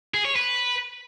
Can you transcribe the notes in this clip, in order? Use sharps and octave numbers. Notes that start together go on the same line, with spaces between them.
G#4
C#5
B4